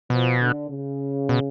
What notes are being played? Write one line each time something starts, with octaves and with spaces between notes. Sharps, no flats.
B2 F3
D3
C#3
B2